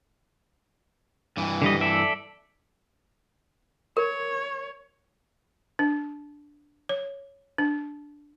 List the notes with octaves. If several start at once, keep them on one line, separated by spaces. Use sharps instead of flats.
G2 E3
D3 G3 D#5
A4 D5 E5
A#4 C#5
D4
C#5
D4